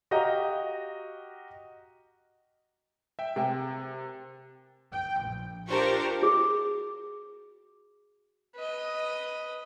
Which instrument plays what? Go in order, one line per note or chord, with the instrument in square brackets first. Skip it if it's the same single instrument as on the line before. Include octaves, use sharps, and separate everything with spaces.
[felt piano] F#4 G4 D#5 F5 A#5
[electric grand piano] E5 G5
[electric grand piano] C3 [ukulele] A#4 G5 G#5
[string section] G5
A#1
D4 F4 G4 A#4 C5 C#6
[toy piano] F#4 G#4
[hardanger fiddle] B4 D#5